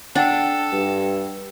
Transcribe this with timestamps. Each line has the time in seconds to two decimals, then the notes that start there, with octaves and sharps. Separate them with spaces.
0.15 D4 A4 F#5 G5
0.73 G2